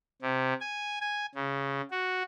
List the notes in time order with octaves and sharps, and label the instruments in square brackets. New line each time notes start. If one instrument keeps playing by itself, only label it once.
[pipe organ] C3
G#5
G#5
C#3
F#4